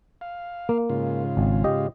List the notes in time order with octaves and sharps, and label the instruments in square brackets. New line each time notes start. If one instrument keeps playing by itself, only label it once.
[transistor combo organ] F5
[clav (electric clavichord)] A#3
[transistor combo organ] G#2 C#3 F4
[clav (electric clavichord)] G#1
G4 D#5